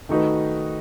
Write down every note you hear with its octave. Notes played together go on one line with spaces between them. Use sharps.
D#3 A3 D#4 F#4 B4